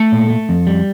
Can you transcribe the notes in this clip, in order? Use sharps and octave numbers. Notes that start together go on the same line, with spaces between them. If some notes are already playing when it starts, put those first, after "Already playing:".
Already playing: A3 A4
A#2
A3
F2
G3